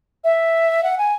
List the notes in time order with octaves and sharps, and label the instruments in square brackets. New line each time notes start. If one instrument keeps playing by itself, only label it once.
[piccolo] E5
F#5
G#5